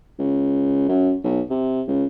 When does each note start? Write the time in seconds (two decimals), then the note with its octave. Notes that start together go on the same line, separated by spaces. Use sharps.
0.19 C#2
0.89 F#2
1.24 B1
1.50 C3
1.87 C#2